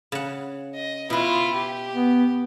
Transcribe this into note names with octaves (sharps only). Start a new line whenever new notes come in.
C#3 F#5
D#5
B2 E4 F4 B4
G4
B3